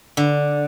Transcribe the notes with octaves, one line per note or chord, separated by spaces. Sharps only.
D3